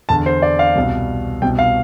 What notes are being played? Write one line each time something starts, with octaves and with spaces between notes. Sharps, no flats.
E2 D3 A5
C5
D5
F5
C2 B2
C2 B2 G5
F5